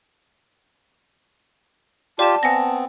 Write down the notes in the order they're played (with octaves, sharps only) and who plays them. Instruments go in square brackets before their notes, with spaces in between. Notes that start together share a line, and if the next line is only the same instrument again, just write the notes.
[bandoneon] F4 G4 [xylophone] D5 E7 [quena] A5
[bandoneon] B3 C4 [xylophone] G#5 A#6